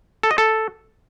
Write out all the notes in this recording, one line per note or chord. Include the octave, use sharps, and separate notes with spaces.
A4
D#5
A4